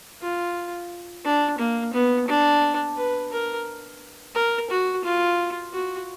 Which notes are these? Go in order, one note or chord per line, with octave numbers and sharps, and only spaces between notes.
F4
D4
A#3
B3
D4
B4
A#4
A#4
F#4
F4
F#4